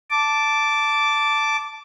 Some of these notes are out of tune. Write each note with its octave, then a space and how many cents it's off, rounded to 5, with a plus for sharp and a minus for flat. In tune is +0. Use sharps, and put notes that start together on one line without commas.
A5 +0 D6 -10